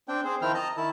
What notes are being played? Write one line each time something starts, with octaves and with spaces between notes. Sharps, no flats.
C4 D4 G5
C4 G#4 C5
D#3 F3 C4 E4 G5 F6
D#5 A5 A#5
D#3 E4 A5